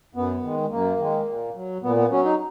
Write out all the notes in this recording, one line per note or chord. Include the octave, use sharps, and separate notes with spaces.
F#2 B3
D#3 G#3
F#2 A#3
D#3 G#3
A#2
F#3
A#2 B3
B3
F#3 C#4
D#4